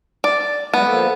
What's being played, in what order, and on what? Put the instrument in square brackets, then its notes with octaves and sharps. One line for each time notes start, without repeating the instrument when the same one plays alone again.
[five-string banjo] D5
[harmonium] G3 G#3 [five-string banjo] B3
[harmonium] F3 A#3 A4